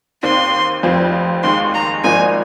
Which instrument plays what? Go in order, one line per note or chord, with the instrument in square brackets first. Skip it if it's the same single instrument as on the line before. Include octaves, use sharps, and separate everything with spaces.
[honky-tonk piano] D#2 D#3 C4 [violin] C6
[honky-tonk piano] F1 F2 F3 C4
[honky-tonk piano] D#2 D#3 G#3 [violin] C6
[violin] A#5
[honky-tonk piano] G#1 G#2 F3 A#3 D#4 [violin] G#5